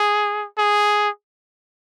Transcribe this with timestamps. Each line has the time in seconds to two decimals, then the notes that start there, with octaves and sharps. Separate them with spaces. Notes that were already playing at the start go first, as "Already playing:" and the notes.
Already playing: G#4
0.58 G#4